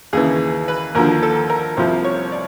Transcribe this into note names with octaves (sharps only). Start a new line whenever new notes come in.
D#2 C#3 E3 G#4
B4
D#2 D3 F3 A#4
A4
A#4
C2 C3 F3 C5
C#5
D5